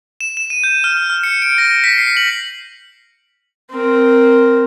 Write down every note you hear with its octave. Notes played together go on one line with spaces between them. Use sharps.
E7
E7
D#7
G6
F6
F6
C#7
D7
A#6
B6
C7
F#7
C4 A#4